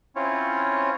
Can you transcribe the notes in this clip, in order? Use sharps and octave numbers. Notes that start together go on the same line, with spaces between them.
C4 C#4 E4 F4 C#5